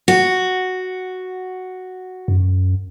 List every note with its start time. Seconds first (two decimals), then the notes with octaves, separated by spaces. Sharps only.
0.08 F#4
2.28 F#2